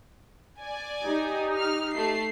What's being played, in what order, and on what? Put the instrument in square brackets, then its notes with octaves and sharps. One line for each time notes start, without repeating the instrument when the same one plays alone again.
[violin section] D5 G#5
[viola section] D#4 G4
[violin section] F6
A3 C7